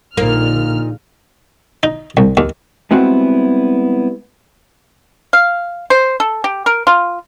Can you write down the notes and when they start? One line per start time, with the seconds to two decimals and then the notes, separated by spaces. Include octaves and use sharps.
0.17 A#1 A#2 D3 A#3 D#4 F6
1.83 D#4
2.17 C2
2.37 D#2
2.91 G3 G#3 B3 C4 E4 F#4
5.33 F5
5.90 C5
6.20 A4
6.44 G4
6.66 A#4
6.87 F4